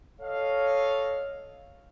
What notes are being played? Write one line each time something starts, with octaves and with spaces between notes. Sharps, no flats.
A4 C#5 D#5 F5